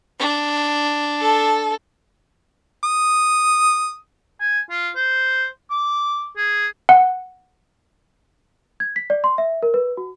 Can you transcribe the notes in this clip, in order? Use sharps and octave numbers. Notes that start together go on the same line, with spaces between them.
D4
A4
D#6
G#5
F4
C5
D6
G#4
F#5
G#6
B6
D5
C6
E5
A#4
B4
F#4